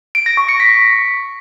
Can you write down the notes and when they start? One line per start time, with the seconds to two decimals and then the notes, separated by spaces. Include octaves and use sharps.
0.15 D7
0.26 A#6
0.37 C#6
0.49 C#7
0.60 B6